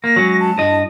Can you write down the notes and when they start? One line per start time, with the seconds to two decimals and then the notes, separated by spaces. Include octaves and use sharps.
0.04 A#3 A#6
0.16 F#3 G#3 C#4
0.40 A5
0.58 G2 E4 D#5